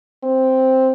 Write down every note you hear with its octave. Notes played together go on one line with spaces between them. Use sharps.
C4